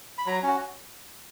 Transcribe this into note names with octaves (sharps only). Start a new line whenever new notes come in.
B5
F#3 A#5
C#4 F#4